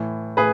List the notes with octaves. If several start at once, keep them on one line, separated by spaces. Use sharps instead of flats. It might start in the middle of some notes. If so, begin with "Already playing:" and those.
Already playing: A2 E3
A2 G#4 B4